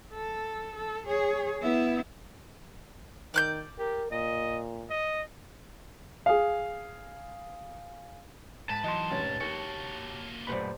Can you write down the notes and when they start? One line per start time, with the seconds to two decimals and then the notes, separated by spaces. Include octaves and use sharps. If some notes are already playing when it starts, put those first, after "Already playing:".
0.14 A4
0.76 A4
1.06 G#4 C#5
1.62 B3 E4
3.34 D#3 D5 F#6 G6
3.79 G4 A#4
4.11 A#2 D#5
4.90 D#5
6.26 G#4 F5
8.69 G#2 B4 A5
8.84 G#2 E3 F#3 D#5 C6
9.10 F1 C#4 C#5
9.41 D#2 A#3 F#4 C#5
10.47 D#1 F#2 A3 B4 C5 D5